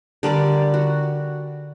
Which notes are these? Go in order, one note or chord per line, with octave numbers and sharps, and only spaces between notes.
D3 G3 A#4 D5
F#4